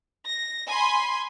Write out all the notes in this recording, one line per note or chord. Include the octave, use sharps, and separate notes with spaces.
A#6
G#5 B5 C6